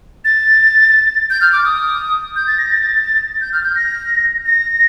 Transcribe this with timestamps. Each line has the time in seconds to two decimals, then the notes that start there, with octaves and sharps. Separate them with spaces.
0.25 A6
1.30 G6
1.41 F6
1.53 D6
1.65 D#6
2.36 G6
2.47 A6
2.58 A#6
2.70 A6
3.41 G6
3.53 F6
3.63 G6
3.76 A#6
4.46 A#6